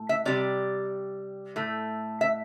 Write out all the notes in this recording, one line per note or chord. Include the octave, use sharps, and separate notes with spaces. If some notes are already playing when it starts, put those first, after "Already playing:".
Already playing: A2
E5
C3 G3 D5
A2 A3
E5